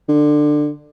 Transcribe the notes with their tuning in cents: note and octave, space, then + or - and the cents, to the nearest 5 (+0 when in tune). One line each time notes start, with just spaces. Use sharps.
D3 +20